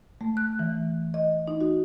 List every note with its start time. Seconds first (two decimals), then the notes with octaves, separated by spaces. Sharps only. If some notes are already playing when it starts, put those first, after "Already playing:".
0.21 A3
0.37 F#6
0.59 E3
1.14 D#5
1.47 D#4
1.61 F#4